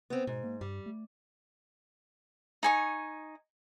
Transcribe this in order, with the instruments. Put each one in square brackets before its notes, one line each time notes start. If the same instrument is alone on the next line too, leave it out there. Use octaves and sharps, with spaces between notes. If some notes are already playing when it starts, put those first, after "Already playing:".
[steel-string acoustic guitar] B3 C4
[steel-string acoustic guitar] G#2 [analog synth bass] B2
[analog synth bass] A#3
[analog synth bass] G2 [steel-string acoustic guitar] G3
[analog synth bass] A3
[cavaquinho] D#4 G#5 C#6